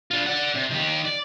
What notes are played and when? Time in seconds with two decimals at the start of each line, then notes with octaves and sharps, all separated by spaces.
0.11 D4 F4
0.26 D5 F#5
0.55 C3
0.71 D#3 G4
1.05 D5